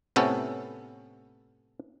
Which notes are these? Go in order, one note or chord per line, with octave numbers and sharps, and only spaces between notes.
A2 C3 B3 C#4 A4